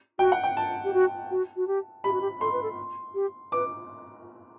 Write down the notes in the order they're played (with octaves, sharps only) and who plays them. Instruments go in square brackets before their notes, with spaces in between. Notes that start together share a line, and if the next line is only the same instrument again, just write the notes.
[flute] F#4 [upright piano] G5
[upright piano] F#5
G5
A5
[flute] G4
F#4
F#4
F#4
G4
[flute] G4 [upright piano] B5
[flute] F#4
G4
[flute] A4 [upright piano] C6
[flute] B4
A4
G4
[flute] B4 [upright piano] D6